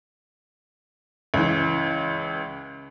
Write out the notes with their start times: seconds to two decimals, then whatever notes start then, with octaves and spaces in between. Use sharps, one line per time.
1.34 C#2 E3